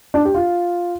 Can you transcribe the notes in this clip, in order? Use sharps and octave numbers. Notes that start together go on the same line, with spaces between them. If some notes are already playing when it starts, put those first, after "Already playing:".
D4
G4
F4